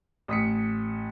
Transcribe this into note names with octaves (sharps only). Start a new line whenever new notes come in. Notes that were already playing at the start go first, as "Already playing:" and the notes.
A1 D#6 B6 C#7